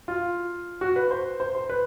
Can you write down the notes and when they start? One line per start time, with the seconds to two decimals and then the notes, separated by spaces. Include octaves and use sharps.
0.08 F4
0.81 F#4
0.96 B4
1.11 C5
1.40 C5
1.55 C5
1.69 B4